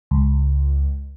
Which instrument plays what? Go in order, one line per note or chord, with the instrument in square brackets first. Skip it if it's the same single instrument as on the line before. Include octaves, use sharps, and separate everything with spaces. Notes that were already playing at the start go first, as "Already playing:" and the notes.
[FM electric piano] C#2